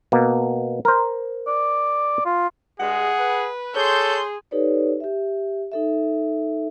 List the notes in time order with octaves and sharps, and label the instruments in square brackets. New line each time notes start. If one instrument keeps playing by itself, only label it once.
[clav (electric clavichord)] B2 A#3
A#4 C5
[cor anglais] D5
F4
[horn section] G2 G#3 [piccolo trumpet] G#4 [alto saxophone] F#5
[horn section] B4
[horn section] G#4 [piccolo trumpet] A4 [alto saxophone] C#5 [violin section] C6 G6
[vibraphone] D#4 G4 A4 B4 C#5 D5
G4 E5
D#4 A4 E5